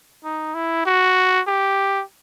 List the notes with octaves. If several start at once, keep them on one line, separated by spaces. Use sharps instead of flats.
D#4
E4
F#4
G4